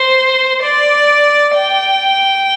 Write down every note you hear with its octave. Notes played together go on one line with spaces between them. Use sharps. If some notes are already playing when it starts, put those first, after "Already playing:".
Already playing: C5
D5
G5